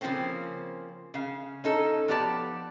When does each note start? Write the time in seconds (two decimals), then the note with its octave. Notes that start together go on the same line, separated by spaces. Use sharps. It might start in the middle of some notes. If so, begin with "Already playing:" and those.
0.01 C#3 F3 G3 A#3 C4 C#4
1.14 C#3 F5
1.64 C#4 D#4 A4
2.08 F3 B3 G4 D5 A5